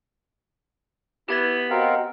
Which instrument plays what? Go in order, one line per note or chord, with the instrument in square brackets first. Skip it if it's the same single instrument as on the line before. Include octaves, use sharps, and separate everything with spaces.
[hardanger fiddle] B3 [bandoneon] E4 [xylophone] G4 G#6 A6
[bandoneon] C4 A#4 F5 [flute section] F#4 D#5 F#5